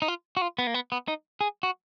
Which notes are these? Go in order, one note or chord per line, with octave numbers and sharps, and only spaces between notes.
D#4
F4
F#4
F4
B3
A#3
B3
B3
D#4
G#4
F#4